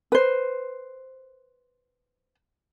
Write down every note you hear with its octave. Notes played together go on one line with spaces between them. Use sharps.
B4 C5